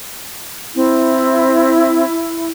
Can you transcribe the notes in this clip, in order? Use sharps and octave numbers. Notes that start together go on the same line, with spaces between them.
C4 E4